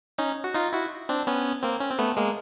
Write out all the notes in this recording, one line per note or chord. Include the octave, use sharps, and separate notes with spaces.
C#4 D#4
F#4
D#4 F4
E4 F#4
C4 D4
B3 C#4
A#3 C4
C#4
C4
A3 B3
G#3 A#3